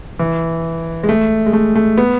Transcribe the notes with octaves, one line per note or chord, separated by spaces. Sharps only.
E3
G#3
A3
G#3
A3
A3
B3